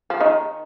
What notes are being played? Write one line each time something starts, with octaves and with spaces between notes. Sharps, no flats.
F3 F4
D#3 D#4